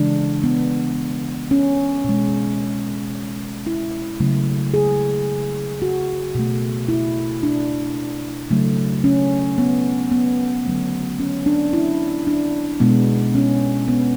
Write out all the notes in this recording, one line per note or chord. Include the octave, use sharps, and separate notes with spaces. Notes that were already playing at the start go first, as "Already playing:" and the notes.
Already playing: C#3 E3 G#3 D4
B3
C#4
B2 G#3
E4
C#3 F#3 A3
G#4
F#4
B2 A3
E4
D4
C#3 F#3 A3
C#4
B3
B3
D3 F#3 A3
C#4
D4
E4
D4
B2 G#3 B3
C#4
B3